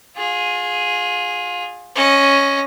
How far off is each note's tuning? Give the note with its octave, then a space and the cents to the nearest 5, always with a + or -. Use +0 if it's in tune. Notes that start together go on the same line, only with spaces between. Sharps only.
F4 +30 G#4 +0
C#4 +0 D#5 +15